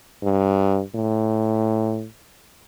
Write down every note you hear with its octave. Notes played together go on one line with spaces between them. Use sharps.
G2
A2